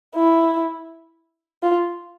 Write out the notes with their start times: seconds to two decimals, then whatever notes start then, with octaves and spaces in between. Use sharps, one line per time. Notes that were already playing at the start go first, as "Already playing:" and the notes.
0.16 E4
1.63 F4